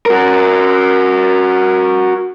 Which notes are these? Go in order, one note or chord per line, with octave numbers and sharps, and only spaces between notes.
F#4 A#4